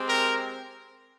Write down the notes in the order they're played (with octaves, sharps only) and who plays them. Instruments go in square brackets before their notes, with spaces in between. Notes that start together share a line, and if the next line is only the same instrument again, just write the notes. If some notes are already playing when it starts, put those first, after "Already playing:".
Already playing: [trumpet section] G#3 C4 G4
A#4